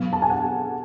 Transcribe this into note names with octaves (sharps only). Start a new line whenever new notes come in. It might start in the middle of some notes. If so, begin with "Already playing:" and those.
Already playing: B2 F#3 B3 F5
A5
G#5
F#5